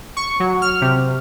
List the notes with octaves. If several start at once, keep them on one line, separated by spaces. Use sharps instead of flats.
C#6
F#3
F6
C3